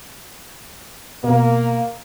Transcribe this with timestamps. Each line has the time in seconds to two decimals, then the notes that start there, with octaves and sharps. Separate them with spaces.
1.24 B2 A#3